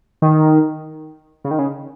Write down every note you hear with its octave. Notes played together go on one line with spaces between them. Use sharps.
D#3
C#3
D#3
C#3